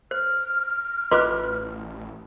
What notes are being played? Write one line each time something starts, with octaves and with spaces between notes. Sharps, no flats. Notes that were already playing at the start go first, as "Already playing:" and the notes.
C5 F6
A1 F4 B4 D#5 C6 D6 F#6